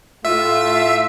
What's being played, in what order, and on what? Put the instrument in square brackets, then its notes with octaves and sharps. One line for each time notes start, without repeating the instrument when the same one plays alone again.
[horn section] A2 A3 F4 [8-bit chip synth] E5